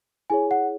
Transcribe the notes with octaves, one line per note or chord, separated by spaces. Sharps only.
E4 G#4 C#5 G#5
F#5